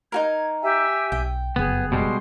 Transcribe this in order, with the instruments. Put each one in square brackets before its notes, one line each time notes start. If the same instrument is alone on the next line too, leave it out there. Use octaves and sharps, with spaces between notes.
[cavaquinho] D#4 F#4 A#4 [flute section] G#6
[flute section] G4 E5 G#5
[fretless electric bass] B1 [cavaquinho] G5
[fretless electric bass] F1 F#2 C#3 [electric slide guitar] B3 [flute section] G#4
[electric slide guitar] B2 G3 G#3 [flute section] C6